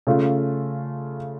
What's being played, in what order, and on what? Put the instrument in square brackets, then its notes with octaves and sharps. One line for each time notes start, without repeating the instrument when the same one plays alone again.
[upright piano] C#3 A3 C#4 F4